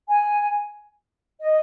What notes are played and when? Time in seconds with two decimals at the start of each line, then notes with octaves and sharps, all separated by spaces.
0.08 G#5
1.41 D#5